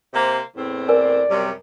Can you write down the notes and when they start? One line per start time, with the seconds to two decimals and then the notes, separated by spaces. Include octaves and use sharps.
0.14 C3 A#3 C5
0.56 E2 A2 C4
0.89 A#4 D5 G#5
1.30 F#2 C3 G3